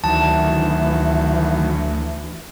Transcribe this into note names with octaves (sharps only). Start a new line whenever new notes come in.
D2 D#3 E3 F#3 A5